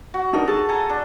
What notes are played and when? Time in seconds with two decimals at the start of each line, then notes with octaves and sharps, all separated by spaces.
0.14 F#4
0.33 D4 D#4 A#4
0.48 G#4 A4 A5
0.69 A4 G#5 A#5
0.89 D4